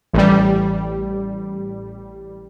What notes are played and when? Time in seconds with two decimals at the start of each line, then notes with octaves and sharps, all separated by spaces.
0.13 A1 G3